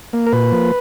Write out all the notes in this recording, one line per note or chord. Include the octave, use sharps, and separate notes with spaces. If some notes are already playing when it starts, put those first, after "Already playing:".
A#3
A#4
A#2 B4
F3 A#3